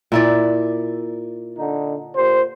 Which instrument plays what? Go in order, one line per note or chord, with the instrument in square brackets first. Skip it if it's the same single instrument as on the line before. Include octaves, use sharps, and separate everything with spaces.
[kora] A#2 E4 D5
[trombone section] D3 D#4
A#2 G4 C5